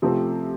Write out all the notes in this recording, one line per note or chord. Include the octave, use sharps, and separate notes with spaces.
C3 F3 A3 C4